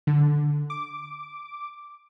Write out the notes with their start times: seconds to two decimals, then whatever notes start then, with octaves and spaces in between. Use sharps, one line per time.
0.07 D3
0.70 D6